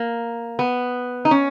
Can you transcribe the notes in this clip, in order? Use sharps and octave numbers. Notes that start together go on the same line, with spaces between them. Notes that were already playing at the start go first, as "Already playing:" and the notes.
Already playing: A#3
B3
D#4
C#4